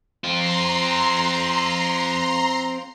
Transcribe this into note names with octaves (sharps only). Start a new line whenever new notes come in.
C4 F4 A#5 C6